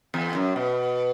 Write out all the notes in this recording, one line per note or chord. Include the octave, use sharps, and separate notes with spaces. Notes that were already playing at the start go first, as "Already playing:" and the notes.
E2
F#2
B2